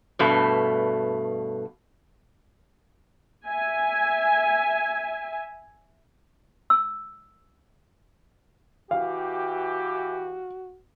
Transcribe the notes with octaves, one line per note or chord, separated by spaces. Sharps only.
G2 B2 A3
E5 G#5
E6
E3 F#4 G4 F5